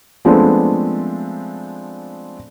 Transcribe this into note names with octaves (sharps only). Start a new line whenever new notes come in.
F3 G#3 A3 B3 C4 D4